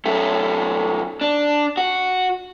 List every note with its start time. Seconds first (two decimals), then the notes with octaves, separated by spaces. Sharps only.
0.06 F#2 A3
1.21 D4
1.77 F#4